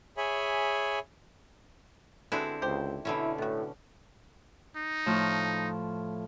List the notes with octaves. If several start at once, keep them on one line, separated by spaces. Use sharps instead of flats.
G#4 C#5 E5 G#5 B5
D3 G#3 B3 C4 E4 F#4
C#2 G4 C5
B2 D3 C#4 E4
A2 B3 F#4
D#4
A2 F3